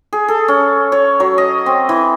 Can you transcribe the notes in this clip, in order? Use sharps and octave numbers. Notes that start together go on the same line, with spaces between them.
G#4
A4
C#4
C#5
F#3
D#5
C4
E3